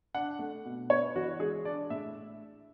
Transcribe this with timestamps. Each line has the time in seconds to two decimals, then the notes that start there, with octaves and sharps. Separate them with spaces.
0.15 D4 F#5
0.39 A3
0.65 B2
0.90 B3 C#5
1.16 E3 F#4
1.40 G#3 G#4
1.65 D4 D5
1.90 A2 E5